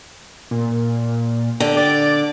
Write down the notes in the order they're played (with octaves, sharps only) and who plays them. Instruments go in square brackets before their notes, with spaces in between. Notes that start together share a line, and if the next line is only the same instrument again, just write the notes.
[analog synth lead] A#2
[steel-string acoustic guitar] D3 [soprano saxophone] G4
[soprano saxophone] D5 [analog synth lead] D6